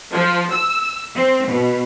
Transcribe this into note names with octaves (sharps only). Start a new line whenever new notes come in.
F3
E6
C4
B2